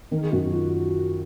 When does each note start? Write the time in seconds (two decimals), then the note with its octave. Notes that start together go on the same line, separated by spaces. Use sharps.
0.11 D#3 A#4
0.21 G#4
0.31 F#2 F#4
0.42 F#4
0.52 F4